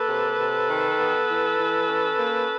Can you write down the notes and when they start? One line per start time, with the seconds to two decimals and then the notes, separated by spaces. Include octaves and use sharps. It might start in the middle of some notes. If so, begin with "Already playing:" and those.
Already playing: A#3 A4 B4
0.09 C3
0.39 C3
0.69 D#3
0.99 B3
1.29 E3
1.59 E3
1.89 C#4
2.19 A#3